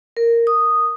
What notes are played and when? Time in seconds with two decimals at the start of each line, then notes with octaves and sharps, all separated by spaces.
0.17 A#4
0.47 D#6